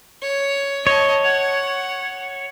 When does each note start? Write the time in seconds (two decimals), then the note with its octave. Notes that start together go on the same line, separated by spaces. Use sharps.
0.22 C#5
0.87 C#5 D#5 A5
1.24 F#5